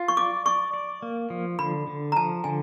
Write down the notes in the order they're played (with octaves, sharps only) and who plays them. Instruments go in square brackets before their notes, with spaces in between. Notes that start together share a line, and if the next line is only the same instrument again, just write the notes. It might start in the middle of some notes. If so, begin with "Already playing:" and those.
Already playing: [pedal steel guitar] F4
[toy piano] C#6
[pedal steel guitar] D5 [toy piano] D6
[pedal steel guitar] D5 [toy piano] C#6
[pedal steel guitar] D5
A#3
F3
[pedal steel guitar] D3 [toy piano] B5
[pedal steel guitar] D3
[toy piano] A#5
[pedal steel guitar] F3 [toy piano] A5
[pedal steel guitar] D3 [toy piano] G#5